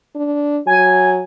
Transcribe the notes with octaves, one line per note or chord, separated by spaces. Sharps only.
D4
F#3 G#5